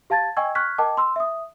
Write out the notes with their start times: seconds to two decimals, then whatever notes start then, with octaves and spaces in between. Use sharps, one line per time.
0.10 G4 F5 A5 G#6 A6
0.37 D#5 G5 G#5 C#6 E6 G#6
0.55 C#6 F6 F#6 G#6 B6
0.78 A#4 D#5 G5 A5 D6
0.97 C6 E6
1.16 E5 D#6